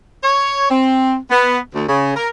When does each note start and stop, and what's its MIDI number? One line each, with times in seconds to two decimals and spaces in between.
0.23 0.69 73
0.70 1.16 60
1.31 1.58 59
1.74 1.85 38
1.88 2.12 49
2.16 2.28 70